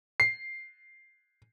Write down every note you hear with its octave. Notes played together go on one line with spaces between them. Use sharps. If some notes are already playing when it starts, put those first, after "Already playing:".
C7